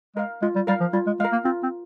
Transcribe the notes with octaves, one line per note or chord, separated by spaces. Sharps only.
G#3 A#4 F5
G#3 F4
G3
G3 A#4 F5
F3
G3 F4
G#3
G#3 A#4 F5
A#3
C4 F4
C4